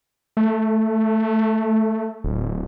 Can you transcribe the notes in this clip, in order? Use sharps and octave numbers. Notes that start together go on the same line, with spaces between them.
A3
D1